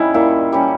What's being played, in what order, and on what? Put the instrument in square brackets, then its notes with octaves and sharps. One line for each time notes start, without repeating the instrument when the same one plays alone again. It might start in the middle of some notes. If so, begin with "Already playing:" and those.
Already playing: [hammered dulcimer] G3 C#4 [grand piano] D#4 E4
[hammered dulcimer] A#2 [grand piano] E4
[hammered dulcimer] G3 C#4